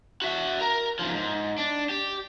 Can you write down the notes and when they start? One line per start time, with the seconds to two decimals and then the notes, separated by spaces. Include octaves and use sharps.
0.22 F#4 E5
0.60 A#4 A#5
0.99 G#2 F3
1.15 G#2
1.58 D4
1.89 G4